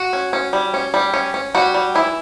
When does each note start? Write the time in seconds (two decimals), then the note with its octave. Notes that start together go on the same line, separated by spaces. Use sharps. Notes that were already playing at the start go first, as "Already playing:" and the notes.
Already playing: F#4
0.13 C#4
0.33 C#4
0.53 G3
0.74 C#4
0.94 G3
1.14 C#4
1.34 C#4
1.55 G3 F#4
1.74 G3
1.95 E3 E4